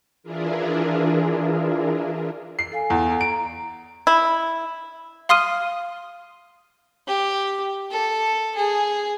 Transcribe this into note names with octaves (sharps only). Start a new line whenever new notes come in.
E3 D4 E4 F4 G#4 A#4
C7
A4 F5 G#5
E2
A#5 D7
E4
F5 C6 D#6 F6 D#7
G4
A4
G#4